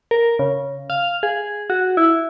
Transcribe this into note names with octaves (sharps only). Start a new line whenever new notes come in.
A#4
C#3
F5
G#4
F#4
E4